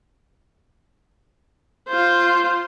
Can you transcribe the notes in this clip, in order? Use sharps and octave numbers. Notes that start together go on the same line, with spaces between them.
F4 C5